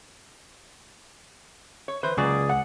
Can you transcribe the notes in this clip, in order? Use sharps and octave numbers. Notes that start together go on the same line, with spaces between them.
C#5
E3 B4 C5
C#2 F#3 A#3 G#4 D5
F#5